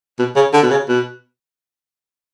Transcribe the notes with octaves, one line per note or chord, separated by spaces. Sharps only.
B2
C#3
D3
B2
C#3
B2